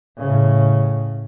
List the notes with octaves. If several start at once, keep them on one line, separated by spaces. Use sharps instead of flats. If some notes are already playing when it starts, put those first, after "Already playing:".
A2 C#3